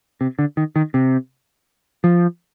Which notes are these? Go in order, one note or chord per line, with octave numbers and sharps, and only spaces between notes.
C3
D3
D#3
D#3
C3
F3